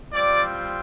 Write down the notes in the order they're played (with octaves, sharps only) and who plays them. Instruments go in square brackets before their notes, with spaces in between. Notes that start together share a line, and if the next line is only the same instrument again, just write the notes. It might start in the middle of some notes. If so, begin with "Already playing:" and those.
[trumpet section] G3 C4 F4 D5